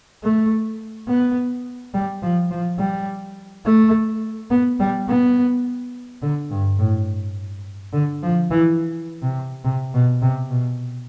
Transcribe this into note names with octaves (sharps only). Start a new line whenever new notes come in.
A3
B3
G3
F3
F3
G3
A3
B3
G3
B3
D3
G2
A2
D3
F3
E3
C3
C3
B2
C3
B2